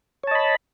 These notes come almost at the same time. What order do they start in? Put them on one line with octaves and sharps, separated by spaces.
C#5 A5 D#5 B5